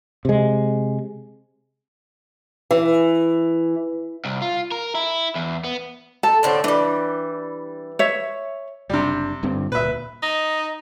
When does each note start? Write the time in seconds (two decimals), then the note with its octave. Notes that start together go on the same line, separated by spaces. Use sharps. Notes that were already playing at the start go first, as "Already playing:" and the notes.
0.25 C3 G#3
2.71 E3
4.25 C2
4.42 F4
4.72 A#4
4.95 E4
5.35 E2
5.64 B3
6.23 A4 A5
6.43 A2 D3 C4
6.64 E3 G3 D4
7.99 C#5 E5
8.90 F#1 C3 G3 D4
9.43 G1 G2 C4
9.72 D1 A#2 B4 E5
10.22 D#4